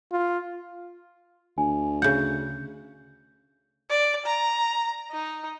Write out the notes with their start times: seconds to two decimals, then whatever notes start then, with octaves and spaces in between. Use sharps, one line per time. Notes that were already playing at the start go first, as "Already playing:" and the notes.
0.12 F4
1.58 D2 G#5
2.02 C#3 F#5 G6
3.90 D5
4.26 A#5
5.11 D#4